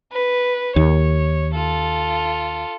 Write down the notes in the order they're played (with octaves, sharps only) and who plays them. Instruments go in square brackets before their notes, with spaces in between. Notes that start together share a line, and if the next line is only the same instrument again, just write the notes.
[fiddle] B4
[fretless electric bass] D#2 [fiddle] C#5
[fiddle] F4 A4